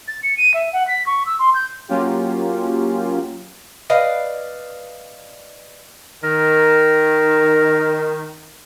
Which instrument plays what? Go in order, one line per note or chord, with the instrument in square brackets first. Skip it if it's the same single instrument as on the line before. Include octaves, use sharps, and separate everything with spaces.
[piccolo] A6
C#7
D#7
E5
F#5
B6
C#6
E6
C6
G6
[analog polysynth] F#3 A#3 C#4 F4 G4
[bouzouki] B4 D5 D#5 F5
[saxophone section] D#3 [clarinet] A#4